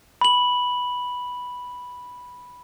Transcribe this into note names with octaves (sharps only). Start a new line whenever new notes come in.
B5 F#7